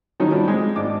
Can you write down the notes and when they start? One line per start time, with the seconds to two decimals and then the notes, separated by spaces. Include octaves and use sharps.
0.20 D#3 F#3 C#4 D#4 E4
0.31 F3 G3 D4
0.48 G#3 C4
0.76 G#1 D4 D6